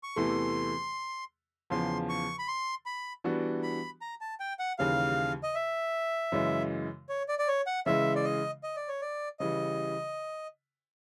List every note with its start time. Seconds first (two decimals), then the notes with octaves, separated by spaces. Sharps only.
0.03 C#6
0.16 E2 C3 E3 A3 C6
1.70 E2 C#3 F3 C6
2.09 C#6
2.39 B5
2.48 C6
2.86 B5
3.24 E3 G3 B3 D4 F#4
3.63 B5
4.01 A#5
4.21 A5
4.40 G5
4.59 F#5
4.79 D#2 C#3 E3 G3 F5
5.43 D#5
5.55 E5
6.32 F#2 C#3 E3 G#3
7.09 C#5
7.28 D5
7.39 D5
7.48 C#5
7.67 F#5
7.86 C#3 E3 G#3 E5
8.16 D5
8.24 D#5
8.63 D#5
8.76 D5
8.88 C#5
9.01 D5
9.40 C#3 E3 G3 D#5